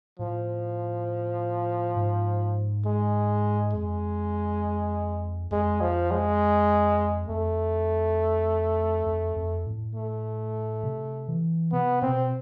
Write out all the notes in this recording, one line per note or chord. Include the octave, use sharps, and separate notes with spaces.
A2 F3
G#2
G#3
F2 G#3
F2 G#3
F3
G#3
F2 A3
F2
F2
A2
A3
C3
E3
C3 B3
B2 C4